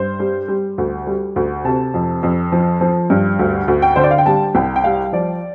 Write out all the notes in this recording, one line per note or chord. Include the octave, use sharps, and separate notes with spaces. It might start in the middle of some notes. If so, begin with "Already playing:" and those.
Already playing: G2 C5
G3
G3
D2
G3
D2
C3 A5
F2
F2
F3
F3
G2
D2
D2
G5
D3 C5
D5
F5
G5
G3 A5
C2 G5
G5
G3 F5
F3 D5